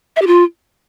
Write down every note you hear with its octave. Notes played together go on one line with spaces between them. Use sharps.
E5
G4
F4